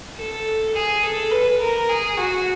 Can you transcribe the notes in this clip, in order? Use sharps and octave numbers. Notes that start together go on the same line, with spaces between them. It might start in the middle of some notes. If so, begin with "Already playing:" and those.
A4
G#4
A4
B4
A#4
G#4
F#4